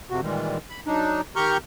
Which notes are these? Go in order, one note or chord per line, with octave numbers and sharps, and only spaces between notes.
F2 C3 F#4
A#2 D#3 E3 G3 G#3
B5
F#3 D4 D#4
D#3 G4 A#5 C#6 F6 G6